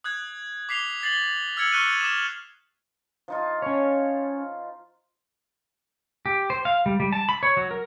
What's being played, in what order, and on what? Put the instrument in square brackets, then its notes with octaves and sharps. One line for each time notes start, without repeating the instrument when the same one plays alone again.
[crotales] D#6 F#6 G#6
D6 B6 C7 F7 G7
A6 C7 F#7 G7
E6 F6 G#6 C#7 F#7
C#6 F6 F#6 C#7 D#7 G7
D6 D#6 E7
[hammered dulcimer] F3 D#4 F4
[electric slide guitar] C#4 C#5
[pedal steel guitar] G4
C5
F5
G3
G3
A5
B5
C#5
F#3
A#4